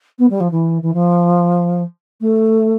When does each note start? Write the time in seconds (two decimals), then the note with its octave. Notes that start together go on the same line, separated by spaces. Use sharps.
0.19 B3
0.30 G3
0.40 F3
0.51 E3
0.82 E3
0.93 F3
2.21 A3